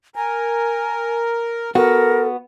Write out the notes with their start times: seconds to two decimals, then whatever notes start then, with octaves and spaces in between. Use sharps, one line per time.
0.16 A#4 G#5
1.75 B3 F#4 A4 A#4